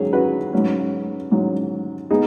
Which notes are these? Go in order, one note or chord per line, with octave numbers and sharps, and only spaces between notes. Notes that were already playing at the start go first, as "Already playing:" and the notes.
Already playing: G#2 D#3 F#3 C#4 G#4 C#5
F#4 B4
G#2 F#3 C#4
G#2 F#3 C#4
G#3 B3 D#4 G#4